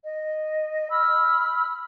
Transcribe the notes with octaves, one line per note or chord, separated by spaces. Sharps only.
D#5
B5 E6 F6